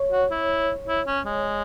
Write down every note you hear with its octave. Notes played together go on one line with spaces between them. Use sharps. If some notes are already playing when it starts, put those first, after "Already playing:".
Already playing: C#5
F#4
E4
E4
C#4
G#3